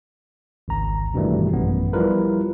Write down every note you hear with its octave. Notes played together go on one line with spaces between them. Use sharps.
G#1 C#2 A#5
G2 B2 D#3 E3 G3 A3
A1 F#2 B3
F3 G3 E4 F4 A#4 B4